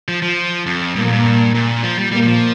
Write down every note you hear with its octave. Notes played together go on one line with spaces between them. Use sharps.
F3
F3
F2
G2 A#2 A#3
F2
G2
A#2
F3
G3
A#2 G3 A#3
G3
F3